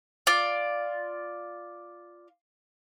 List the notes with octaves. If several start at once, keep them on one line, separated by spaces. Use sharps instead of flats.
F4 D5